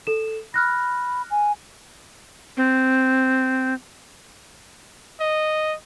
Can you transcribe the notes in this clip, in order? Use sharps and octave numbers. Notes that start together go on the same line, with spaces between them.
A4 E7
B5 F6 F#6 A#6
G#5
C4
D#5